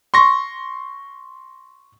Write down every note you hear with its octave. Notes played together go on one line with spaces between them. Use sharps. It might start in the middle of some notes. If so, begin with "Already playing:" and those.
C6 C#6 A#6